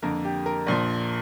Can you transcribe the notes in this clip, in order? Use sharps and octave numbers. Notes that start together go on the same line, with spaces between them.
F2 D3 A#3 A#4
G4
A#4
A#1 A#2 F3